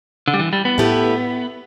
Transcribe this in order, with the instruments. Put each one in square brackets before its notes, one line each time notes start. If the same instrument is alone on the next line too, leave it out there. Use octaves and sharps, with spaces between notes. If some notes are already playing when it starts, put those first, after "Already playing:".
[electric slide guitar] D3
G3
E3
G3
B3
[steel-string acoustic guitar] A2 A3 E4 G4 B4